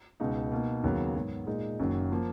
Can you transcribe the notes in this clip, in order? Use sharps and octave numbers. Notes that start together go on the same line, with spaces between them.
C#2 B2 G#3 D#4
B2 A#3 D#4
D#2 C#3 F#3 B3
G#2 F#3 B3
A#2 G#3 D#4
F#1 F#2 D#3 F#3 A#3
F3 A#3